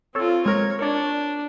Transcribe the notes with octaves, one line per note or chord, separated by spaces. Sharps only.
C4 F4 A4 C#5
G#3 A#4 C#5
D4 A#4 C#5 D5